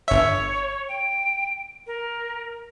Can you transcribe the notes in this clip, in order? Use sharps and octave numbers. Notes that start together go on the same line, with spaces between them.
G1 C#5 E5
G5
A#4